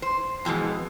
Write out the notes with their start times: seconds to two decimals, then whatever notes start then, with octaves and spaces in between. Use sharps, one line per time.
0.02 C5
0.45 F2 B2 E3 G#3